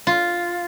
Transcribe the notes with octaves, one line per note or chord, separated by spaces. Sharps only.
F4